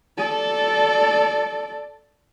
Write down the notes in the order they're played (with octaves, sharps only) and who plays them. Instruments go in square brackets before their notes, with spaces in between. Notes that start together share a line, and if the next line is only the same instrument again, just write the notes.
[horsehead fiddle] A4 D5